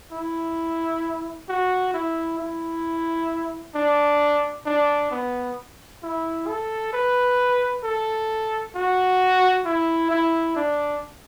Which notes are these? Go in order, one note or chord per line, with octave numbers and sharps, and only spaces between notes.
E4
F#4
E4
E4
D4
D4
B3
E4
A4
B4
A4
F#4
E4
E4
D4